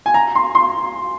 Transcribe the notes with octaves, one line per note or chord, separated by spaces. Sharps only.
G#5
A#5
C6
C6